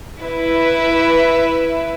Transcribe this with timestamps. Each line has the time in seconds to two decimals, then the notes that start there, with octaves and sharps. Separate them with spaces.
0.23 E4 B4 E5